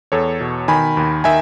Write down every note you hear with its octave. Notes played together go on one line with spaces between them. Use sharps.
E2 A4 C#5
B2
D#3 G#5 B5
D#2
D#3 E5 G#5